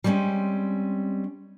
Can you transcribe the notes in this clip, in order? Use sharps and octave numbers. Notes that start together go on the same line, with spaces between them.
G3 G#3 C4 C#4